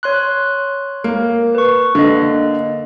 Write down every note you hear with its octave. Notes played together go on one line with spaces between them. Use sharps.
C#5 C6 F#6
A#3
B4 C#6
D3 A#3 D#5